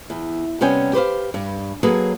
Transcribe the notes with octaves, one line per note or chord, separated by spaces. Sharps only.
E2
C3 G3 B3 C#4 G5 G#5
G4 B4 C5 F5
G2
F#3 A#3 G#4 A4 B4